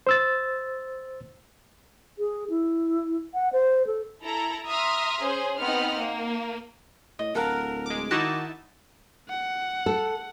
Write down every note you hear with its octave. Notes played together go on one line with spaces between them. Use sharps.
C5 E6 A6
G#4
E4
F#5
C5
A4
E4 A4 A#5
E5 A#5 C6 D#6 F6
C#4 G#4 C5
B3 C4 D#4 F#5 F6
A#3
A2 D#5
D1 A4 A#4 F5 F#5
G#3 D6
D#3 D#4 E4 F#4 A5 C#6 D6
F#5
A4